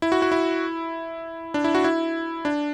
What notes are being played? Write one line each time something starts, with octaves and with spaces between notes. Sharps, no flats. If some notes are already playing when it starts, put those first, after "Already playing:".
E4
F#4
F#4
E4
D4
E4
F#4
E4
D4